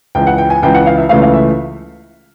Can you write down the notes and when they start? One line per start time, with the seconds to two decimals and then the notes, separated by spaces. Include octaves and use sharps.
0.15 C#2 C#3 E3 G5
0.27 F#5
0.38 G5
0.50 G#5
0.63 C#2 C#3 E3 G5
0.74 F#5
0.86 F5
0.97 E5
1.09 C#2 C#3 E3 A3 F5
1.22 F5
1.34 E5